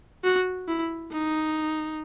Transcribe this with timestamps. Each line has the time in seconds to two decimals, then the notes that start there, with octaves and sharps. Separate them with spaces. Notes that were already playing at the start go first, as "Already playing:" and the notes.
0.24 F#4
0.68 E4
1.13 D#4